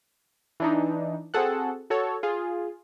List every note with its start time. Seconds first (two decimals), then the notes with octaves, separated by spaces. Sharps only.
0.60 E3 D4 D#4
1.34 C4 F#4 G#4 A4 F#5
1.90 F#4 A4 C#5
2.23 F4 G#4